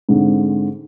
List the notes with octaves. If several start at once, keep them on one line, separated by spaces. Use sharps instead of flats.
G#2 D3 C4